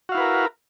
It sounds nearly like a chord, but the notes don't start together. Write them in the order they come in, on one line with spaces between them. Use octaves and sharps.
F#4 F5 E4 B4 A#4